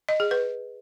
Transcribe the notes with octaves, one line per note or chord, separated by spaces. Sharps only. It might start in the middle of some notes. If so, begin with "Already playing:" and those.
D#5
G#4
B4